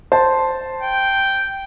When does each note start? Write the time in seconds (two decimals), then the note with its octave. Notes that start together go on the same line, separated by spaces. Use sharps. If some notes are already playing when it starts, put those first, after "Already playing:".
0.12 C5 A5
0.83 G5